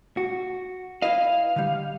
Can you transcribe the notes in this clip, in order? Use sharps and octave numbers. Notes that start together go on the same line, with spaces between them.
F#4
E4 B4 D#5 F5
D3 G3